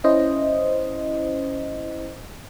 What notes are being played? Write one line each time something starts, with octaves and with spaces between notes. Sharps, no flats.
C#4 E4 C5 D#5